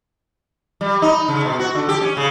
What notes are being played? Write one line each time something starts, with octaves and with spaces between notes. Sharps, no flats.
G3
D#4
C#3
B2
F#4
D3
G4
C#4
C#3